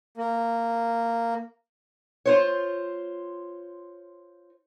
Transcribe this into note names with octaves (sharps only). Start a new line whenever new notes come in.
A#3
F4 C5 C#5